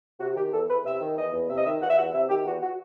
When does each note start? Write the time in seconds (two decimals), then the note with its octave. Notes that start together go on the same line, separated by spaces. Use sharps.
0.20 C3 F#4
0.36 D#3 G4
0.52 E2 A4
0.68 E2 B4
0.85 C3 E5
1.00 D#3
1.17 E2 D#5
1.33 E2
1.49 C3 E5
1.57 D#5
1.65 D#3 E5
1.81 E2 F#5
1.88 E5
1.96 E2 F#5
2.13 C3 E5
2.29 D#3 G4
2.45 E2 F#4
2.61 F#4